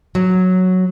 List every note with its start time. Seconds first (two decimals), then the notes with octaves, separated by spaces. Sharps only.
0.15 F#3